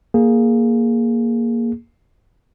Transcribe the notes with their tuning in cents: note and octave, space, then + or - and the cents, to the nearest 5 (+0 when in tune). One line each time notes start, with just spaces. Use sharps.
A#3 +0 G#4 +0